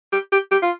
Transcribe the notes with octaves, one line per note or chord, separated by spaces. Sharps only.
G4
G4
G4
F4